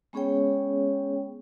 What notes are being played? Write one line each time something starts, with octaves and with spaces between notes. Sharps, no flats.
G#3 B3 C#4 G#4 C#5 G5